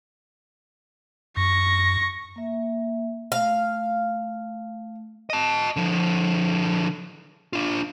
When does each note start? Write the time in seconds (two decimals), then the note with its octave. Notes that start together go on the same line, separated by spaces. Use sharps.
1.37 F#2 C#6 A#6
2.36 A#3 E5
3.32 A3 F5
5.30 D#5 A5
5.76 D3 F3
7.53 D4 F4